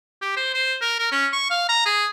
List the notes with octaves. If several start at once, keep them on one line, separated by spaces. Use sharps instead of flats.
G4
C5
C5
A#4
A#4
C#4
C#6
F5
A#5
G#4